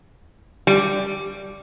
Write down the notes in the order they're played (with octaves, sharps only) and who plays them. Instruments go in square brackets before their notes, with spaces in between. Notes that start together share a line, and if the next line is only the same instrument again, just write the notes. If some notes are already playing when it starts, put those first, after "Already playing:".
[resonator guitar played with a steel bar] G3